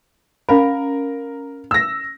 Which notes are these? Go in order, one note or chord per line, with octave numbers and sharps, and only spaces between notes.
C#4 A#4 F5 B5
E6 A#6